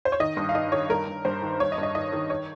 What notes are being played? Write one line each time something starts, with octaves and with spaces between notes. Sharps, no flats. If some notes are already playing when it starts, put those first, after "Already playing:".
C5
C#5
D#3 D#5
G2
F5
D#3 D#5
D#3 C#5
G2 A#4
G2
G2 C5
D#3
G2 C#5
D#5
G2
D#5
D#3 D#5
D#3
C#5